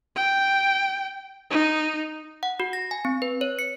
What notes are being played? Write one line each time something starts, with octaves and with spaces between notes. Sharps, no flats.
G5
D#4
F#5
F#4
A#6
G#5
C4
B4
C#5
C#7